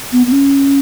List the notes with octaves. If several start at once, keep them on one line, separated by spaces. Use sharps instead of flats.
B3
B3
C#4